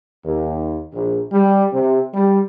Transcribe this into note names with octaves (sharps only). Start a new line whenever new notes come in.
D#2
A#1
G3
C3
G3